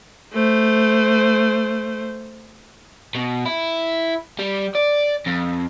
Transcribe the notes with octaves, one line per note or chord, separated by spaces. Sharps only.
A3 C5
B2
E4
G3
D5
F2